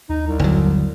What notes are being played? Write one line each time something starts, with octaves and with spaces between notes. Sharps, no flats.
D#2 D#4
C2
G1 F#3